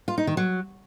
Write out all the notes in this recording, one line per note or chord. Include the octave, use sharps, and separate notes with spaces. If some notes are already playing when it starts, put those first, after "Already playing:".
F4
D#4
D#3
F#3